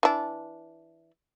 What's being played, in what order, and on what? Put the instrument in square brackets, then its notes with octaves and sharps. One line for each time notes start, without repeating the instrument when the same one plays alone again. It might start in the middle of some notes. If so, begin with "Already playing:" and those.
[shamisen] E3 D4